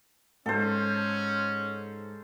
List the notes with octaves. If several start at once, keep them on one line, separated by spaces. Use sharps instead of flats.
G#2 C#4 A4 C5